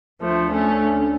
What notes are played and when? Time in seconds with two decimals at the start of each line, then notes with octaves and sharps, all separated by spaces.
0.23 D2 D3 F3 A3
0.51 A3 C#4